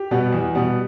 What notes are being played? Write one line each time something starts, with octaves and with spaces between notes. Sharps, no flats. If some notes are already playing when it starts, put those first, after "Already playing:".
Already playing: G4
B2 G3 B3
E2
B2 G3 B3